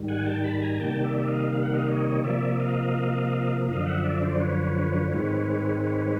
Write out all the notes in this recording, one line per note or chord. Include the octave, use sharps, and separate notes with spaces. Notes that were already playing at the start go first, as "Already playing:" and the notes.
Already playing: G#2 D#3 G3
F#5 G#5
G5 A5
A5 B5
G#5 A#5
C3 D#3 G3 A#3 G5 A5
D5 E5
D#5 F5
F5
F#5
D#5 F5
C#5 D#5
C3 F3 A#3 D5 E5
D#5 F5
F#2 D3 F3 D#5 F5
E5 F#5
D5 E5
C5 D5
B4 C#5
G#2 D#3 G#3 C4 B4 C#5
B4 C#5